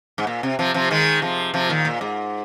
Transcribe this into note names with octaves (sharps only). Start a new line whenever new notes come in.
G#2
A#2
C3
C3 F3
C3 F3
D#3 G#3
C3 F3
C3 F3
A#2 D#3
A#2
G#2